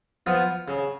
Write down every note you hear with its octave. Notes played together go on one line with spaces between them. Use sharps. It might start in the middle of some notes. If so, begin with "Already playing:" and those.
F3 B3 F4
C#3